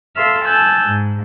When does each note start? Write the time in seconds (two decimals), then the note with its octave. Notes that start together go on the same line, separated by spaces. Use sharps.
0.16 A4 E5 F5 C6 E6 F6
0.45 G#5 A5 E6 F#6 G6
0.85 G#2